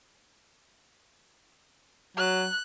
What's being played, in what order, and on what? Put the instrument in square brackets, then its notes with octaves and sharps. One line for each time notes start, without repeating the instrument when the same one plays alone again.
[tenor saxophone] F#3 [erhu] F#6